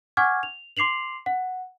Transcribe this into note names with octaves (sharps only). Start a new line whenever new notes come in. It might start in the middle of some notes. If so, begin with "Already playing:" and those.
F#5 G#5 C#6 D6 F6 G#6
F7
C6 D6 C7 F7 F#7
F#5